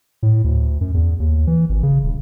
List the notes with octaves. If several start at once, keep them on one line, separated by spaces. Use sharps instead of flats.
A2
D2
F#2
E2
D#2
E3
G#1
C#3
D#1